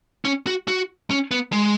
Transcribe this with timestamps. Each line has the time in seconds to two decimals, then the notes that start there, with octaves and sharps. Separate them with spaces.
0.25 C#4
0.47 F#4
0.68 F#4
1.10 C#4
1.31 B3
1.52 G#3